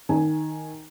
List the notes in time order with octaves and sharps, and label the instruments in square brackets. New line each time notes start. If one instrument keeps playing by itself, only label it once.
[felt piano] D#3 G#5